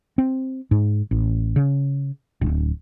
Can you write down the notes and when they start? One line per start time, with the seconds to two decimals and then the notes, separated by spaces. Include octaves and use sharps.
0.18 C4
0.71 G#2
1.11 A1
1.56 C#3
2.41 D1